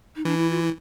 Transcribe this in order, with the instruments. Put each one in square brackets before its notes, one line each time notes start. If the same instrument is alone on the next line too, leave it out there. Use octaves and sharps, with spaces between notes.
[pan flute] D#4
[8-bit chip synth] E3 [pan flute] D4
[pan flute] E4
F4
E4